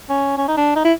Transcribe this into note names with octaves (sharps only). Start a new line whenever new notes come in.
C#4
C#4
D#4
D4
D#4
E4